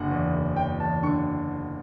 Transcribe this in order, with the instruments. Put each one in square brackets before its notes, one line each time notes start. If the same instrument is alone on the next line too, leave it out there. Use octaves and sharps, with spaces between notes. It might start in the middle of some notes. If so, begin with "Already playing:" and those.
Already playing: [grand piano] F#1 D3 F#5
E2
F#1
F#1 G5
E2 A5
D3 C#6